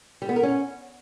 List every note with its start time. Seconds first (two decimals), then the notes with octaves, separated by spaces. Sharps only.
0.22 G3
0.29 B3
0.36 A#4
0.43 C#4